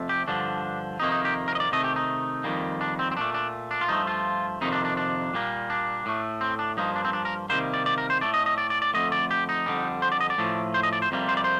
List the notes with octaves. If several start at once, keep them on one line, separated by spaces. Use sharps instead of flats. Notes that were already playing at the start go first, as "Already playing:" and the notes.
Already playing: F2 C3 A3
G4
G2 D3 F3 D4
F2 C3 D#3 A#3 D#4
D#4
G4
A#4
D#5
D5
C3 D#3 A3 D#5
G4
D#4
F2 D#3 G3 A#3
D4
C4
C4
A#2 A3 D4
D4
D4
F4
G2 F3 A3 D#4
F4
F2 C3 D#3 A#3 D#4
D4
D4
D4
A#2 G3 A#3
D4
A2 A3
C4
D4
G2 F3 A#3 D#4
D4
C4
D4
A#4
C3 D#3 G3 A#3 C5
D5
D5
A#4
C5
A2 A3 D5
D#5
D#5
D5
D5
D5
F2 D3 A3 D#5
D5
G4
D#4
F2 D3 G3
C5
D5
D#5
D5
A2 F3 A3
C5
D#5
D5
C5
F2 C3 G3 A#3
C5
D5
C5